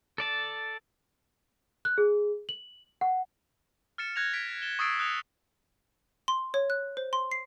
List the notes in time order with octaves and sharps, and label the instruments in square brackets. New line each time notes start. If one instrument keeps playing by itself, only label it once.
[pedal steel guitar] A4 D5 A5
[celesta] F#6
G#4
F#7
F#5
[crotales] F6 A6 C#7 E7
F#6 G#6 A#6 F7
B6 D7
A6 E7 G7
C#6 D#6 E6 A6 C7 D7
D#6 F#6 C#7 E7 F7
[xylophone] C6
C#5
F#6
C5
C6
C7